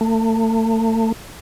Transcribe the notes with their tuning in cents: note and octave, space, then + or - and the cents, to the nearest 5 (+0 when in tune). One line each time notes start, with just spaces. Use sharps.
A3 +35